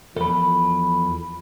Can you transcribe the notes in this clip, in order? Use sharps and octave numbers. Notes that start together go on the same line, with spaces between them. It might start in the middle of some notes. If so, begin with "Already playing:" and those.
E2 F3 A4 B5